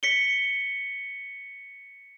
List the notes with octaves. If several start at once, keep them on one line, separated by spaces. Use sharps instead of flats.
B6 C#7 G7